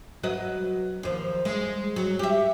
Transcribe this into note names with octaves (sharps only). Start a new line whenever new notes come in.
F#3 B4 D#5
D#2 F3
G#3
F#3
G4 E5